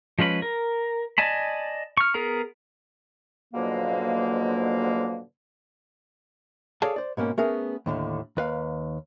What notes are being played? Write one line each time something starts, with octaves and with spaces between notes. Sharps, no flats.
F3 G#3 C#4 B4 B5
A#4
D5 D#5 G#5 A5 B5
C#6 F6
B3 G#4 A#4 A#5
G#2 B2 D3 F3 F#3 A#3
G#4 A4 C#5 D5 F5 A5
C5 D5
G#2 B2 A#3 C#4
A3 B3 C#4 G#4 A#4
D#2 A2 D3
D#2 B4 F5